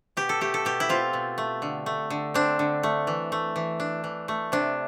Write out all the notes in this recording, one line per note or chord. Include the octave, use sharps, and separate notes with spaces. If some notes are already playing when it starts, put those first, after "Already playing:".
B2 G4
A4
A3 G4
A4
B2 G4
E4
C4 F4
B2
A3
D3
A3
D3
C4 D4
D3
A3
E3
A3
E3
D4
E3
A3
C3 D4